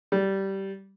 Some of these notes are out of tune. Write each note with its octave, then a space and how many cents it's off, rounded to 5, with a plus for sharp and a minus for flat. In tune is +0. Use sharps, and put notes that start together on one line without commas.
G3 -15